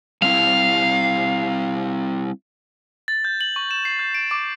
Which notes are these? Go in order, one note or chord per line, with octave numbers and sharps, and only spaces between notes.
G3 C4 E4 F5
A6
G6
F#7
C#6
E7
C7
G6
D7
D6